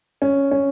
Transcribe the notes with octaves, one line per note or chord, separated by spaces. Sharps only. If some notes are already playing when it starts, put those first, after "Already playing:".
C#4
C#4